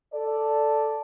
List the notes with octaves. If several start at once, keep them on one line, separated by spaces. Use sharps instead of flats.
A4 D5